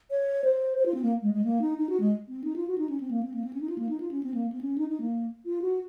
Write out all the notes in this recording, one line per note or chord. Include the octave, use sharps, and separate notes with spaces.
C#5
C5
C5
F4
C4
A#3
G#3
G#3
A#3
D#4
D#4
F#4
G#3
C4
D#4
F4
F#4
D#4
C#4
C4
A#3
C4
A#3
C4
C#4
D#4
F4
A#3
D#4
F4
C#4
C4
A#3
C4
C#4
D#4
D#4
A#3
F4
F#4